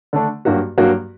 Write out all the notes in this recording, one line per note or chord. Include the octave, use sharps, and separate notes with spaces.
D3 A3 D4
G2 F#3 A#3 F#4
G2 F#3 A#3 F#4